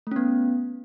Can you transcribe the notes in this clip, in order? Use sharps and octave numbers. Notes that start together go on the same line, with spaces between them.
A3 B3 C#4